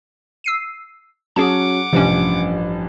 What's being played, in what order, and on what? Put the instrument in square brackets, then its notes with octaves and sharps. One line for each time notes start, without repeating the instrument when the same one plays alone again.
[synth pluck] E6 C7 D#7
[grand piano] F#3 C#4 [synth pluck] G#4 A5 [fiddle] F#5 D6
[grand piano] A1 G2 [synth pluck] C3 E3 C#4 [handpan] F3